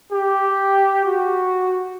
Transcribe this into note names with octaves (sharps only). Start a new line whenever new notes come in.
G4
F#4